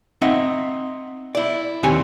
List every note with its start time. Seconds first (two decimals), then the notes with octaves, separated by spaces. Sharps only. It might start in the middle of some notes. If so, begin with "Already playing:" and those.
0.22 C4 D#4 D#5 E5 F#5
1.35 E4 D5
1.83 D#2 C3 C4 G4 C#5 G#5